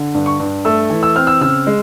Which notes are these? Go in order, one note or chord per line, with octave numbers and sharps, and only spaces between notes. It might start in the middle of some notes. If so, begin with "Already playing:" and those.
Already playing: D3
G2
C#6
G2
A3 E6
E3
E6
C4 F6
E6
C#3 E6
G#3